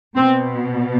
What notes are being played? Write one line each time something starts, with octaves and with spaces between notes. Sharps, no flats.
B2 C4